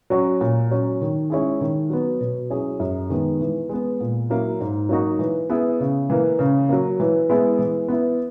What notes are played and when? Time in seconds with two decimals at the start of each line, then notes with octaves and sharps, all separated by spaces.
0.10 F#3 C#4 F#4
0.41 A#2
0.71 F#3 C#4
1.01 D#3
1.30 G#3 C#4 E4 G#4
1.61 D#3
1.90 F#3 B3
2.20 B2
2.50 F#3 C#4 E4 G#4
2.80 F#2
3.10 D#3 G#3 B3
3.41 E3
3.69 G#3 B3
4.00 A#2
4.30 F#3 A#3 E4
4.60 G#2
4.89 F#3 A#3 D#4 F#4
5.19 E3
5.50 B3 E4 G#4
5.80 C#3
6.10 E3 A#3
6.39 C#3
6.69 F#3 A#3
7.00 E3
7.29 G#3 B3 E4 G#4
7.59 E3
7.88 B3 E4